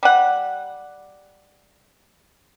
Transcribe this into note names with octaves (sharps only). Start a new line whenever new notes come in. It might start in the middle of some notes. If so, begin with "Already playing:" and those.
G3 F#5